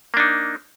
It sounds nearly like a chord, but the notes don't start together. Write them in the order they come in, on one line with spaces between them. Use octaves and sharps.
A#3 D4 D#4